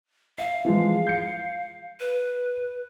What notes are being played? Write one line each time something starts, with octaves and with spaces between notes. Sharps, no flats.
E5 F5
E3 F3 G#3
G6 C#7
B4